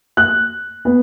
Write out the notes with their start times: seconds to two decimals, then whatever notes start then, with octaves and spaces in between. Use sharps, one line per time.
0.17 F#6
0.85 B3